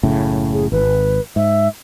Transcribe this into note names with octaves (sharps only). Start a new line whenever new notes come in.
F#1 A2 C#3
G#4
G#1 B4
G#2 E5